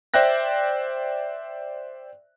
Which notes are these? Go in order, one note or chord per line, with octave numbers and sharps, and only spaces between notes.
C5 D5 E5 G5 F#6 A#6